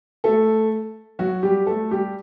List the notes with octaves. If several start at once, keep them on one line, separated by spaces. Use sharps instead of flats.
A3 A4
F#3 F#4
G3 G4
A3 A4
G3 G4